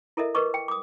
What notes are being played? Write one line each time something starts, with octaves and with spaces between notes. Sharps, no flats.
E4 A4 A#4 D#5 E5
A#4 B4 D#5 C#6 D6
G5
D6 D#6